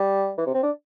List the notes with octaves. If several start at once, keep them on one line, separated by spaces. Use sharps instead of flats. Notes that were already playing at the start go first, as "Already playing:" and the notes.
Already playing: G3
E3
C3
C4
D4